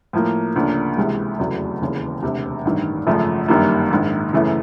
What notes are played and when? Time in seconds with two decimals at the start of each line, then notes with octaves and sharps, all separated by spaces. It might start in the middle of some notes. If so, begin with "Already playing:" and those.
0.13 A2 F3 A#3
0.56 D2 C#3 F3 A#3 D4
0.97 C#2 C3 E3 G#3
1.39 F1 E2 C#3 F#3 A3
1.80 E1 D#2 C#3 E3
2.22 E1 D2 C3
2.65 A1 G2 D#3
3.06 G#1 F#2 C#3 F3 A3
3.48 G1 F#2 D#3 G3 A#3
3.91 A#1 G#2 D#3
4.33 F#2 C#3 E3 A3